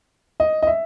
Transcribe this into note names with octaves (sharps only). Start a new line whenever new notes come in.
D#5
D#5
E5